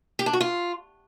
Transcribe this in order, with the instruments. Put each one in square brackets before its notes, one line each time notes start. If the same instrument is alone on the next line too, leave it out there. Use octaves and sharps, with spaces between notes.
[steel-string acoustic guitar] G4
D4
F#4
F4